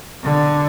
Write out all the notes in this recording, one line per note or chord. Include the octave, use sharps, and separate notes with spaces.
D3